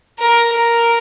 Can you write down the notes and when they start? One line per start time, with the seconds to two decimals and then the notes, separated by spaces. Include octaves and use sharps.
0.19 A#4
0.53 A#4